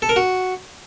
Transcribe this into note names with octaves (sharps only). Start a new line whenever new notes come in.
A4
A#4
F#4